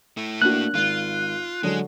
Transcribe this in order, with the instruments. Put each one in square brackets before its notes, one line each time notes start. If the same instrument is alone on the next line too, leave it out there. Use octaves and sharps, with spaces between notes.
[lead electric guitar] A3 E4
[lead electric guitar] A3 E4 [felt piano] A#3 D4 F#4 [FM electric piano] F#6
[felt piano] G#1 [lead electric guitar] F4
[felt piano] D3 F#3 A4 [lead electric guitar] G#3